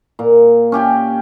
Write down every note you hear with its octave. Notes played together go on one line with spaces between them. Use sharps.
A#2
C#4 G4 G5 G#5